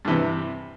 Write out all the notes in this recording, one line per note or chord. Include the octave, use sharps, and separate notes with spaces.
G2 C3 E3